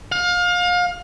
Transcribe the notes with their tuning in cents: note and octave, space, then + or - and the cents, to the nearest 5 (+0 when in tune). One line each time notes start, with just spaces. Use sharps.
F5 +30